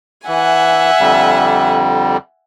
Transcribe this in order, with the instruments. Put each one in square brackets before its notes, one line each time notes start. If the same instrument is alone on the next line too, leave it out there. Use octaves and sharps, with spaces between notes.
[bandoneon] E3 [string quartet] E5 F#5 G#5
[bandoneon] F2 D3 G3